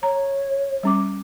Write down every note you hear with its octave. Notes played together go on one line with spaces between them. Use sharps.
C#5 A#5
G3 C#4 D6